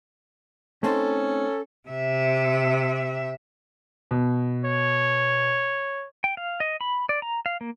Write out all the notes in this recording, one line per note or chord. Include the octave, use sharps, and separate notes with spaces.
A3 C4 C#4 D#4 A4
C3 E5
B2
C#5
G5
F5
D#5
B5
D5
A#5
F5
A#3